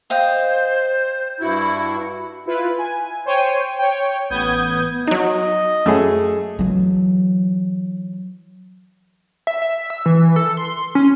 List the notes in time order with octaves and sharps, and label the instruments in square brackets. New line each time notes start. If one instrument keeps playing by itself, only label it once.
[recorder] C5 [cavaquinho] D#5 F5 G5
[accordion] G2 E4 [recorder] F#4
[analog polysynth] E4 F4 B4
G#5
C5 C#5 G5 D#7
C#5 G5
A1 B3 D#6 G6 G#6
[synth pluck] F#3 D#4 [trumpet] D#5
[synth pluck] F#2 [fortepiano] A3 G#4
[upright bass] E3 F#3
[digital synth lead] E5
E5
E6
E3
A4
C6
C#4